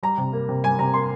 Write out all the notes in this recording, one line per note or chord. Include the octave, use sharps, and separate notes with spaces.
G3 A#5
C3
A#3
C3
G3 G#5
C3 A#5
A#3 C6